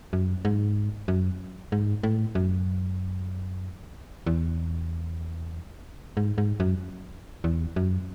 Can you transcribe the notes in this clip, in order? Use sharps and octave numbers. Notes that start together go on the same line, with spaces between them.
F#2
G#2
F#2
G#2
A2
F#2
E2
G#2
G#2
F#2
E2
F#2